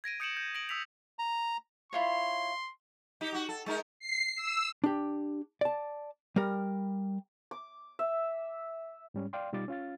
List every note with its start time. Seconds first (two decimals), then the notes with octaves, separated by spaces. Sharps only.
0.04 G#6 A#6 D7 D#7
0.20 D#6 G6 C#7 D7 E7 F#7
0.37 G6
0.55 A#6 D7 F#7
0.69 D#6 E6 B6 F7
1.19 A#5
1.93 E4 F4 C#5 C6
3.21 D#4 G4
3.32 F#4 G4
3.49 A4
3.66 G#3 D#4 A#4
4.00 C7
4.36 E6
4.84 D4 G4
5.61 D5 A5
6.36 G3 A#4
7.51 D6
7.99 E5
9.14 G#2 G3 C#4
9.33 D5 F5 G5 C6
9.53 B2 G3 D#4 F4 D6 A6
9.68 C#4 F4 F5 A6